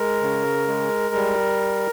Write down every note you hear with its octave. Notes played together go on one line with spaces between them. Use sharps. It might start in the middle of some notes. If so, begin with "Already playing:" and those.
Already playing: G#3 A#4
C#3
G#3
G3